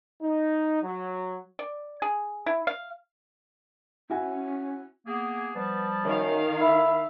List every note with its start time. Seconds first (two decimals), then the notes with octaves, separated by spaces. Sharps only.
0.22 D#4
0.82 F#3
1.59 D5
2.02 G#4
2.46 E4
2.67 F5
4.10 C#4 E4 F#4 G#5
5.06 A#3 B3 G#4
5.55 F3 G3 B3 A5
6.04 F#2 D#3 F5
6.61 E4 E5